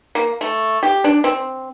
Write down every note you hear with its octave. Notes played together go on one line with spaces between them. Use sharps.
A#3
A3
G4
D4
C4